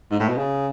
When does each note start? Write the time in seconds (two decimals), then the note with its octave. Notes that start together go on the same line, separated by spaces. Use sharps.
0.11 G#2
0.20 A2
0.29 B2
0.37 C#3